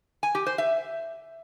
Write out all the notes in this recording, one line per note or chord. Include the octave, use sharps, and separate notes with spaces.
G#5
G4
C5
E5